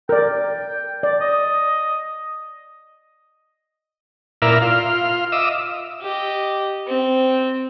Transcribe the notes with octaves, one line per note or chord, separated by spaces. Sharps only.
A#4 D5 G5
D5
D#5
A#2 E4 A#4 D5 E5 F6
F4 F5
D#5 E5 D6 E6
G4 D#5
C4